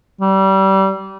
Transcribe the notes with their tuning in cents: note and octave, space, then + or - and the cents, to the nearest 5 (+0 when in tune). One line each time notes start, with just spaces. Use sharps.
G3 -25